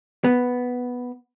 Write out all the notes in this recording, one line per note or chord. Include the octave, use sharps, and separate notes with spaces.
B3